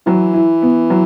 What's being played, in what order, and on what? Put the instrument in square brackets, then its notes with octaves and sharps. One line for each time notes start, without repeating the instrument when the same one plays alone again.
[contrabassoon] E3 [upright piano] F#3
[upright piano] E4
B3
F#3